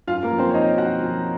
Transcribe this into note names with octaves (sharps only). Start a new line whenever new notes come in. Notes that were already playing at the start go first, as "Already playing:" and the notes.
F#2 F4 F5
A#3 A#4
F3
C4 C5
C#5
F3 D#4 D#5
F3 F#4 F#5
F3